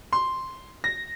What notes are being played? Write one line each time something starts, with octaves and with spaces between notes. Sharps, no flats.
C6
A#6